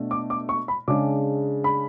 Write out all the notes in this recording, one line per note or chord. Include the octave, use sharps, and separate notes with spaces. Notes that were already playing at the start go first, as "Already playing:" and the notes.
Already playing: B2 A3 D4
D6
D6
C#6
B5
C#3 G#3 D4 D6
B5